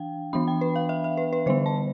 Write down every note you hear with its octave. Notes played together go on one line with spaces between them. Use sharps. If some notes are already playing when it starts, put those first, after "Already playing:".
Already playing: E3 D4 F5 G5
E3 B3 D4 B5
G5
B4
F5
E5
E5
B4
B4
D3 G3 B3 C5
A5